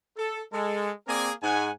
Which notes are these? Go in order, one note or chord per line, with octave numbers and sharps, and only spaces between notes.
A4
G#3 A4
A#3 C4 G#4 A#4 D5 G#5
G#2 F#5 G#5